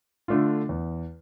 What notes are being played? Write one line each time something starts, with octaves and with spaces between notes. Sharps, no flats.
D3 A3 D4 F4
E2